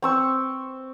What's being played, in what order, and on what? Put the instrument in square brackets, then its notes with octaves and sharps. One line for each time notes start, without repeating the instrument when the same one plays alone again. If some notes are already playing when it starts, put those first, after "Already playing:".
[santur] C4 C#6 E6